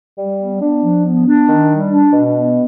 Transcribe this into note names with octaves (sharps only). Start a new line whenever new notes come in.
G3
B3
D4
F3
B3
D4
D#3
G3
D4
B2
B3